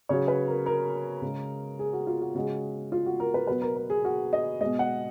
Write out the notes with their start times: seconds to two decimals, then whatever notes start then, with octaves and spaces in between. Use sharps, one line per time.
0.09 C#3 F#3 C#5
0.28 B4
0.48 A#4
0.66 A#4
1.22 C#3 G#3
1.79 G#4
1.93 F#4
2.07 F4
2.21 F#4
2.35 C#3 G#3 F#4
2.92 F4
3.06 F#4
3.20 A#4
3.34 B4
3.47 B2 F#3 B4
3.62 A#4
3.76 A#4
3.90 G#4
4.05 F#4
4.33 D#5
4.61 B2 G#3 D#5
4.79 F#5